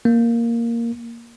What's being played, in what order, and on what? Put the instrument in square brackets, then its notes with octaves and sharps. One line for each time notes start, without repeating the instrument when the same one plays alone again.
[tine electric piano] A#3